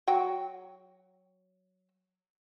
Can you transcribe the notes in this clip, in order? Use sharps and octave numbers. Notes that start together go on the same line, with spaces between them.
F#3 F#4 G5